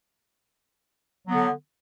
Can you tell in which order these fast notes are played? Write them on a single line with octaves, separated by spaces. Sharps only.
F#3 B3 D3